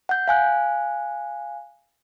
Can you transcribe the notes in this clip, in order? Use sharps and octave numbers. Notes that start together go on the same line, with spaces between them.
F#5 G6
F5 G#5 F#6